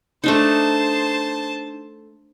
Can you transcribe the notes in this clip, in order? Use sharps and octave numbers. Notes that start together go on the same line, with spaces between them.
A3 D4 D#4 C5 A5